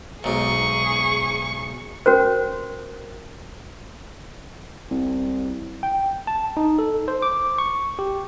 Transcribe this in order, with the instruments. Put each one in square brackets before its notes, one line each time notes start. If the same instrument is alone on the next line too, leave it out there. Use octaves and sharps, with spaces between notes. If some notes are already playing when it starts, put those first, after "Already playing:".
[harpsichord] B1 G#2 [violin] G#4 C#6
[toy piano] C#4 F#4 A#4 C5
[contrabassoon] C2
[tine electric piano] G5
A5
D#4
A4
C5
D6
C#6
G4